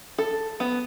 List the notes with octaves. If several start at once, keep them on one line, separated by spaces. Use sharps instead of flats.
A4
B3